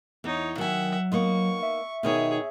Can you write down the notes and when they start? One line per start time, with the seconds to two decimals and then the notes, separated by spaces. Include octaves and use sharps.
0.24 E2 D#4 C#5
0.58 D#3 F#3 E5 F#5 G#5
1.12 A#3 B3 D#4 C#6
1.63 E5
2.03 B2 D#3 D#4 G#4 C#5